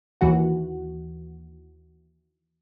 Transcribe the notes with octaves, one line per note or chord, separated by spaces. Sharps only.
D#2 E3 F#4 F#5